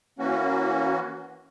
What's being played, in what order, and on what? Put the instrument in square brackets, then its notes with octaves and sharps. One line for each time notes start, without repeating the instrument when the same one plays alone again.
[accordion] E3 A#3 C#4 F#4